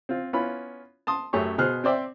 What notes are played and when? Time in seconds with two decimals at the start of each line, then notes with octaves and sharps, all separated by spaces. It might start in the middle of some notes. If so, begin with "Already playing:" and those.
0.09 C4 F4
0.33 B3 C#4 E4 F4 B5
1.07 A5 C6 D#6
1.33 F#2 A3 G4 G#4 C#5
1.58 B2 G#4 C5 F6 F#6
1.84 C4 C5 D5 E5 G5